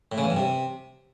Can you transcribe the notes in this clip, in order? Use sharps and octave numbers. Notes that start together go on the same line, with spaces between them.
A2
C#3
E2
G2
C3